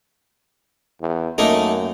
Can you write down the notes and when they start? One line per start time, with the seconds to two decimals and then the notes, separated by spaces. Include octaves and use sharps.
1.01 E2
1.38 F#2 A3 A#3 D#4